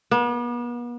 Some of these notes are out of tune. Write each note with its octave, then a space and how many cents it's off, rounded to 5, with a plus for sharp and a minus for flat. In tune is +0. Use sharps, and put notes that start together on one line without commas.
B3 -40